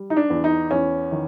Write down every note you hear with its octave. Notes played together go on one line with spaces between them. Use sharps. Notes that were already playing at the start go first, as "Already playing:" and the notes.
Already playing: G3
D#4
D4
E2
D#4
E2 C#4
D#3